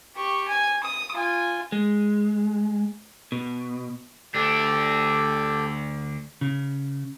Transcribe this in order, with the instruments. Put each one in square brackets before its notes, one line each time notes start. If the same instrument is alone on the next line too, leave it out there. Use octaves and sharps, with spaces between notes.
[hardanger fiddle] G4 C#6
G#5
D#6
F4 G#5
[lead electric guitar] G#3
B2
[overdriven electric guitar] D2 D4 [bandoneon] G4 A4
[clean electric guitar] C#3